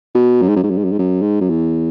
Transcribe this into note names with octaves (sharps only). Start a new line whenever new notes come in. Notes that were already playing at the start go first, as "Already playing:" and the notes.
B2
F#2
G#2
F#2
G#2
F#2
G#2
F#2
G#2
F#2
G#2
F#2
E2